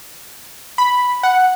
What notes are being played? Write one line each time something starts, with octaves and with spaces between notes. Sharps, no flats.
B5
F#5